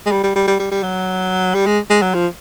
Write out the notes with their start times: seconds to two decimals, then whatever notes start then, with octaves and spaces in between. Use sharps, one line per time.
0.06 G#3
0.12 G3
0.23 G3
0.36 G3
0.47 G3
0.59 G3
0.71 G3
0.83 F#3
1.55 G3
1.66 G#3
1.90 G#3
2.02 F#3
2.14 F3